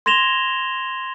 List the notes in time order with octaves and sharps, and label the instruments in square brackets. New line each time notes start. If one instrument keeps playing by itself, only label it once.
[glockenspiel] C6 G#6 A#6 E7 F7 G7